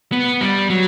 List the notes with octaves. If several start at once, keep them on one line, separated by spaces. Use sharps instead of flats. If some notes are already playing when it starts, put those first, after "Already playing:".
B3
G3
F#3